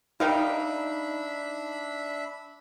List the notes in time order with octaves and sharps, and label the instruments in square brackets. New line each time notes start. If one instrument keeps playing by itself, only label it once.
[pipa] G3 A#4 F5 [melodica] D4 E5 B5 [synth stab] D#4